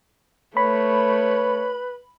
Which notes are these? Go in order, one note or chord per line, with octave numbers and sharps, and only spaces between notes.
A3 B4 C#5 B5